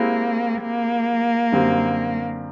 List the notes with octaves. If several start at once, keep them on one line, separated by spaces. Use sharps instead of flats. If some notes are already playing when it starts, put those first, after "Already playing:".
Already playing: G#3 A#3 C4 E4 G4
A#3
F#2 D3 G3 C4